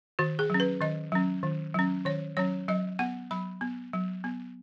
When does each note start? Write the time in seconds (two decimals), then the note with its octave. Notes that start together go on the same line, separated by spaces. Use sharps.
0.19 D#3 F#4
0.39 G#4
0.50 F#3 C#4
0.60 B4
0.81 D#3 D#5
1.12 F#3 C#4
1.43 D#3
1.74 F#3 C#4
2.05 D#3 C#5
2.37 F#3 C#4 C#5
2.68 F#3 D#5
2.99 B3 F#5
3.31 F#3 B5
3.61 B3
3.93 F#3
4.24 B3